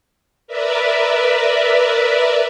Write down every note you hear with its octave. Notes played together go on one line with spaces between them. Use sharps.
A#4 B4 D5 E5